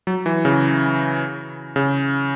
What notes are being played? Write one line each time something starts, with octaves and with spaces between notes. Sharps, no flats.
F#3
E3
C#3
C#3